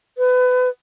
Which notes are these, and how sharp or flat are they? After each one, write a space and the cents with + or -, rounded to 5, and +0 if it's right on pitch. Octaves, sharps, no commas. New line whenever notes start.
B4 +30